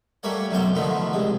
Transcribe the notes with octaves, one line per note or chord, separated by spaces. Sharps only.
G3 A3 A#3 C#5 F#5
B1 F#2 C3 A3 F#4 G5
D3 D#3 F3 A3 B3
C2 G#3